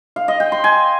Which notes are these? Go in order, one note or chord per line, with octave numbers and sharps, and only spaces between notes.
F5
D#5
G5
C6
G#5